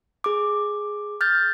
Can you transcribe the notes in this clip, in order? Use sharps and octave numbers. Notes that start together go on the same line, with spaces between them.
G#4 D6
F6 G6 A6